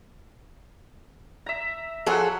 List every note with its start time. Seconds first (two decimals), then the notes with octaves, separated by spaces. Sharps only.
1.46 E5 A#5
2.06 F3 F#3 G#4 A4 F#5